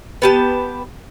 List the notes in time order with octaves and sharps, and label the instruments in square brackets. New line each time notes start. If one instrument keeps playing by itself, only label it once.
[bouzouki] B3 G4 A5